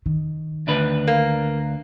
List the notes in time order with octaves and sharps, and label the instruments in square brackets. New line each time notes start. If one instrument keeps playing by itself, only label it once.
[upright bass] D#3
[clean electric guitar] D2 D4 B4
[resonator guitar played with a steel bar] A#3